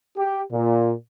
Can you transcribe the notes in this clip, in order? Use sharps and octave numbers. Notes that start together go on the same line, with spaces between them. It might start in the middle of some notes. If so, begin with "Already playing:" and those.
G4
A#2